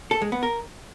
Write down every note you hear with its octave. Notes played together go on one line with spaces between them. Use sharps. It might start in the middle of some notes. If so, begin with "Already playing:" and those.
A4
G#3
B3
A#4